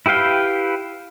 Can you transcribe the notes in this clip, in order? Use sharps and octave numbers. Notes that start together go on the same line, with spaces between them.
E4 G4 B4 F5 G5